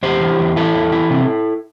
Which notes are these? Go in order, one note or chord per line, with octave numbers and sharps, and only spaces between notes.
E2 G4 C5
E3
E2
E3 E4 A4
E2
E3
C3